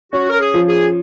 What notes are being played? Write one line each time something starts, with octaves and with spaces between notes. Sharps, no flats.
C#4 F#4
A#4
G#4
F3
G#4